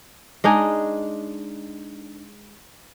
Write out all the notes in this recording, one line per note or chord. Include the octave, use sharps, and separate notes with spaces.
G#3 D4 D#4 G#4